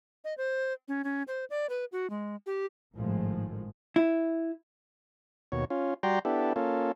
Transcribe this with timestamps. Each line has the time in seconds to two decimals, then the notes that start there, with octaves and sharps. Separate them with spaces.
0.25 D#5
0.38 C5
0.88 C#4
1.04 C#4
1.28 C5
1.50 D5
1.69 B4
1.92 F#4
2.10 G#3
2.46 G4
2.95 G#1 A2 D#3 F3 G#3
3.96 E4
5.52 D#2 B2 C#5
5.70 C#4 F4
6.03 G3 F#4 D5 G5 A#5 C6
6.25 B3 D4 E4 G4 A4
6.56 A#3 C#4 F4 A4